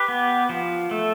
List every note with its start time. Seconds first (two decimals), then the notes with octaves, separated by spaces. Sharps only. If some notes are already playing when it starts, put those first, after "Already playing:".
Already playing: G4 B4
0.08 B3
0.49 F3
0.91 A3